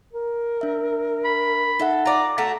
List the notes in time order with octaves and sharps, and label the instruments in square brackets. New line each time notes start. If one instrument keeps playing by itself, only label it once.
[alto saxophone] A#4
[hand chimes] D4 E5
[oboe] B5
[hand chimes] D#4 E5 F#5 [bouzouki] A4
[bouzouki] F4 D5 [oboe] A#5
[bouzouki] A3 D4 F#4 [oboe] A#5 [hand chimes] B6